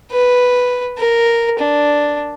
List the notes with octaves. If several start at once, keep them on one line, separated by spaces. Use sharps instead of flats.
B4
A#4
D4